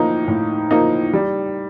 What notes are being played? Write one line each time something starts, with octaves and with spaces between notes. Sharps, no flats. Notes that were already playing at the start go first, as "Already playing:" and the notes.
Already playing: A2 F3 A#3 D#4
A2
F3 A#3 D#4
G3